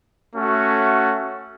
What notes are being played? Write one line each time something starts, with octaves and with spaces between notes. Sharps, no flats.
A3 C#4 F#4